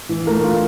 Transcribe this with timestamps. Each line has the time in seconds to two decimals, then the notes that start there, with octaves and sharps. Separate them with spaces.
0.09 E3
0.27 A3 A#4
0.44 F4